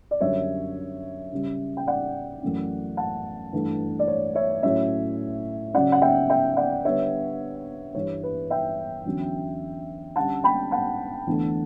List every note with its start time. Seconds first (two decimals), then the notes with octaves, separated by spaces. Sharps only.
0.11 D5
0.21 F#2 D3 G3 C#5 E5
1.32 C#3 G3 C#4
1.77 G5
1.87 D5 F#5
2.42 F#2 E3 A3 C#4
2.97 F#5 A5
3.53 G2 E3 A3
3.99 D5
4.08 C#5
4.35 C#5 E5
4.63 A2 F#3 C#4 C#5 E5
5.74 C#3 F#3 C#4 D5 F#5
5.92 F#5
6.02 E5 G5
6.30 E5 G5
6.57 D5 F#5
6.84 D3 G3 B3 C#5 E5
7.95 G2 E3 G3 C#5
8.23 B4
8.50 E5 G5
9.06 E2 D3 F#3 C#4
10.16 D3 G3 C#4 F#5 A5
10.44 G5 B5
10.71 F#5 A5
11.27 E2 D3 A3 D4